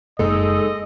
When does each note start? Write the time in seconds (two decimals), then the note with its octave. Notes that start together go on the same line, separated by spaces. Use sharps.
0.19 F#1 F#2 G#3 A#3 D#4 A4 D#5